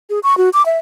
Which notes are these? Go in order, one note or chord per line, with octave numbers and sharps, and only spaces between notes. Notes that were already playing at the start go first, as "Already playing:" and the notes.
G#4
C#6
F#4
D6
E5